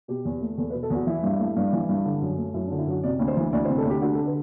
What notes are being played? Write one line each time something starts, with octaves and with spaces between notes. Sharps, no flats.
B2 G4
E2
A3
E2 A4
B4
B2
A4
E2 F#4
E3 E4
G2
A3
G2
E3
G2
D3
F#2
A3
F#2 E4
D4
D3
E4
F#2 F#4
C3 D5
D2
C5
E3
D2 D5
C5
C3
A4
D2 G4
D3 F#4
A4
B4